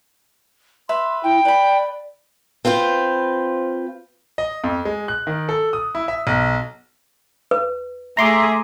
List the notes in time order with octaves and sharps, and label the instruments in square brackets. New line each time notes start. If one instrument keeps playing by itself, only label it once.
[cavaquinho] B4 E5 [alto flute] C6
[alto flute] E4 [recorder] G5
[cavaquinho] B4 B5 [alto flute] D5
[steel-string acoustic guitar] C4 F4 B4 C5
[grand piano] D#5
F2
G#3
F#6
D#3
A4
D#6
E4
E5
B1
[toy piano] B4
[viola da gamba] A3 G#4 [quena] E5 [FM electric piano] A#5 C6 D6